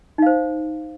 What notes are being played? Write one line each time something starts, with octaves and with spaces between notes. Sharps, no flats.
D#4 C5 F5